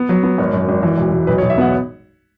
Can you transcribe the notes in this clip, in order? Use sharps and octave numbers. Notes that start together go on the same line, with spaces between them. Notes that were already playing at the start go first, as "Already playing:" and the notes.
Already playing: B3
F#3
B3
G#1 C#5
F#2
G#1
E3
E1
E1
B1 B4
C#5
B1
E5
B3 F#5